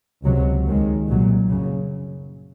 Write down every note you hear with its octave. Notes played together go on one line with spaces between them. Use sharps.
C#2 C3 F#3
D#2 D#3 G#3
C2 A#2 F#3
F#2 C#3